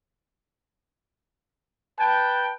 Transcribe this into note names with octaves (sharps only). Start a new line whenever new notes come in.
B4 G5 A5